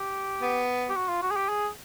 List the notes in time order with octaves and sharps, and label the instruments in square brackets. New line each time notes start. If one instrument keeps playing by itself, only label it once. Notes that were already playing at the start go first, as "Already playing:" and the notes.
Already playing: [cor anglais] G4
[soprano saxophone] B3
[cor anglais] G4
F#4
F4
F#4
G#4
G4
G#4